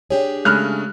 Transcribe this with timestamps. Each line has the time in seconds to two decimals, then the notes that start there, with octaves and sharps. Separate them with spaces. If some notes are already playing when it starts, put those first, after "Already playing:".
0.10 D4 G4 G#4 C#5
0.45 C#3 G#3 A3 B5 F6 F#6